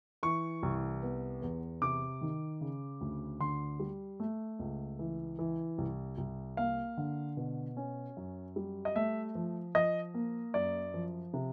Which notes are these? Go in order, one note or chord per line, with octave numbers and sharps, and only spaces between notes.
E3 C#6
C2
B3
E2
C3 D6
D#3
C#3
D2
D3 C6
G3
A3
C#2
E3
E3
C2
C2
A#3 F5
D3
B2
C#4
F#2
G3
D#5
A3 E5
F3
F3 D#5
A#3
F#2 D5
F3
C3